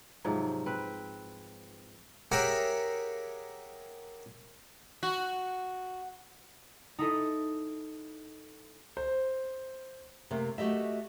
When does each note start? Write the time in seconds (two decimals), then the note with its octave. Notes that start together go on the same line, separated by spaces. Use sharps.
0.24 G#2 C3 F3 F#3
0.66 C4 B4
2.32 G4 G#4 A#4 C#5 E5 F#5
5.03 F#4
6.99 D#4 E4 A4 D#5
8.97 C5
10.31 C3 A3 A#3
10.58 A3 F#4 G4 D#5 E5